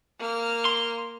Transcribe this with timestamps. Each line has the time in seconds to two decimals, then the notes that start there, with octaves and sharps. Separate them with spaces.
0.19 A#3 F6
0.65 C6